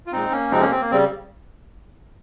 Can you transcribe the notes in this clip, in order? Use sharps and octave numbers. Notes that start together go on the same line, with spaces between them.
F4
A#2 G#3 C4 D#4
A#3 C#4
F2 C3 F3 G#3 C4 D#4
A#3 C#4
C4
A#3
C#3 G3 C4